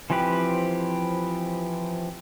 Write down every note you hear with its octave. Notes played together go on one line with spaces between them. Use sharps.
E3 F3 C4 G4 B4